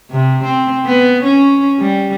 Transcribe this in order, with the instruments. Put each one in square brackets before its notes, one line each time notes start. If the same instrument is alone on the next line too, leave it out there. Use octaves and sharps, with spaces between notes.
[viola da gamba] C3
C4
B3
C#4
G3